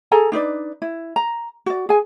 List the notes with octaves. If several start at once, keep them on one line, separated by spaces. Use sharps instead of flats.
G#4 A4 G#5 A#5
D4 D#4 B4 D5
E4
A#5
F#4 D5
G#4 G#5